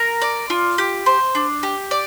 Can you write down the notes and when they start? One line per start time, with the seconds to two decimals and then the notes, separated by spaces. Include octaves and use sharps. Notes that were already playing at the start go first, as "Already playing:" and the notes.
Already playing: A#4
0.22 D5
0.50 F4
0.78 G4
1.06 C5
1.35 D4
1.63 G4
1.91 D5